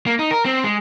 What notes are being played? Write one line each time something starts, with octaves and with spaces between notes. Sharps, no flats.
A#3
D#4
A#4
C4
G#3